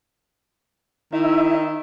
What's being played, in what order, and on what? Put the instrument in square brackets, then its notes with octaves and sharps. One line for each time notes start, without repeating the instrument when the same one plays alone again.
[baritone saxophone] D#3 [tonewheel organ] D#4 E4 E5